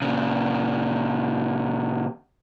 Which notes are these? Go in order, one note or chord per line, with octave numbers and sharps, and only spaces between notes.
A#2 C#3